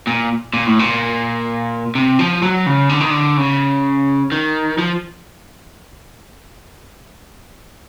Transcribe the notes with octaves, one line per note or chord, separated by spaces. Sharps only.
A#2
A#2
A2
A#2
C3
F3
F#3
C#3
D3
D#3
D3
C#3
D#3
F3